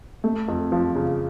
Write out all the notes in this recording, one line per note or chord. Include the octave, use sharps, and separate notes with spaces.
A3
F2
F3
C#3